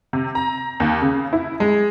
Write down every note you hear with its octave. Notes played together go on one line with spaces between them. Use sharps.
C3
A#5
D#2
C#3
E4
G#3